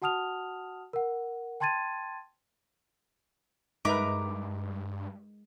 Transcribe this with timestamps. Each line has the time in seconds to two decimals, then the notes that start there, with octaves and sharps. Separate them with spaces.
0.02 F#4 F#5 A5 D#6 F6 F7
0.93 A#4 F#5
1.60 G5 A5 C6 G#6 A6 D#7
3.85 G2 G#3 D#4 A#4 B4 E5 A#5 D6